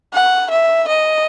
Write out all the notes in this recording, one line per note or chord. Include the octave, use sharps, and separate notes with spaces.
F#5
E5
D#5